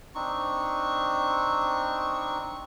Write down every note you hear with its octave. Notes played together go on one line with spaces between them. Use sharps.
C4 D4 D#4 C#6